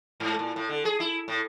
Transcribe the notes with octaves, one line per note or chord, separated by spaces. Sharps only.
G#2
A#2
A2
D3
G#4
E4
A2